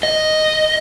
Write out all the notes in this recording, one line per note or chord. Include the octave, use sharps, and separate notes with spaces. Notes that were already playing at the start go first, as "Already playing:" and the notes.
D#5